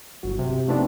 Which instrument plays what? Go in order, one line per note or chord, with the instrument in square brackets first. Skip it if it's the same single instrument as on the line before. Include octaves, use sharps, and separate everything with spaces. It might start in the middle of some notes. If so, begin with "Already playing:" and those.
[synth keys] G1 F#3
C3
F3 A3 B3 C4 D4 D#4